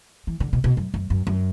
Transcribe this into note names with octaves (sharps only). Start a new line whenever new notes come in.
E3
D3
B2
B2
F#2
F#2
F#2
F#2